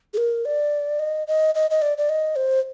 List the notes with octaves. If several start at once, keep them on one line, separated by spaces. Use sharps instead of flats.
G#4
A#4
D5
D#5
D#5
D#5
D#5
D5
D5
D#5
C5